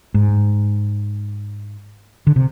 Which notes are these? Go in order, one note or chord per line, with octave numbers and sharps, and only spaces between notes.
G#2
D3
C3